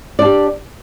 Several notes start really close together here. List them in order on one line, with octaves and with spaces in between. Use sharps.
D5 D4 G4